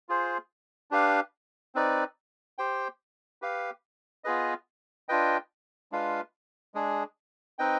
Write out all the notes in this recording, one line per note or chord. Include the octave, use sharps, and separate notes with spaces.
F4 G#4 C5
D4 G4 B4 F5
C4 D#4 B4 D5
G4 C5 G5
G4 B4 F5
B3 F4 G#4 B4 D#5
D4 F4 B4 D#5 G5
G#3 D4 F4 B4 F5
G#3 D4 G#4
C4 D#4 B4 D#5 G5